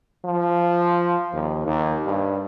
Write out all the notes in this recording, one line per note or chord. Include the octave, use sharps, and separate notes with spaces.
F3
D#2
D#2
G2